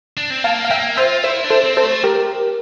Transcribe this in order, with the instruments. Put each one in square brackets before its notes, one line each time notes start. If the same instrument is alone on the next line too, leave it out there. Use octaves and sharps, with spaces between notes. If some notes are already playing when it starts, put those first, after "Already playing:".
[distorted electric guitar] D4
C4
[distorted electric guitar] A#3 [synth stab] F5 A5
[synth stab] F5
[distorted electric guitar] A#3 [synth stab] E5 G5
[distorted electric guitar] F4 [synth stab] C5 E5
[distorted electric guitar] E4 [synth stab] C5 E5
[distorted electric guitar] D4
[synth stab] A4 C5
[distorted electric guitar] C4
[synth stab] A4 C5
[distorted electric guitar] A3
[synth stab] G4 A#4